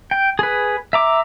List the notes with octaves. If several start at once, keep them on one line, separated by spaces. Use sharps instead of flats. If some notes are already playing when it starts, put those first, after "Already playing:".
G5
G#4 B4
E5 A#5 D6